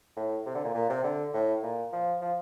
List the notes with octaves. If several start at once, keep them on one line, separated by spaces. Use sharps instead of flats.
A2
C3
D3
A#2
A#2
C3
D3
A2
A#2
F3
F3